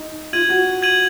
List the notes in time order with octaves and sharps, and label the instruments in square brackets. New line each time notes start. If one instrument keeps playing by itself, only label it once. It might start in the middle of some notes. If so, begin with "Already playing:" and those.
Already playing: [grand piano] D#4
[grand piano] F4 [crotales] G#6 D#7 F#7
[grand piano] F#4
[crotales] G#6 D#7 F#7